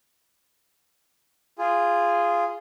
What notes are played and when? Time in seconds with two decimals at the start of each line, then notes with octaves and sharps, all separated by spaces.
1.59 F4 G#4